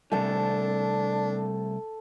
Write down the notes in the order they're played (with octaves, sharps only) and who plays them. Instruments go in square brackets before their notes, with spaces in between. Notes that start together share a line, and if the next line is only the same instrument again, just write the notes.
[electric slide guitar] C3 G3 A3 [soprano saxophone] D4 [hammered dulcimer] A4 A5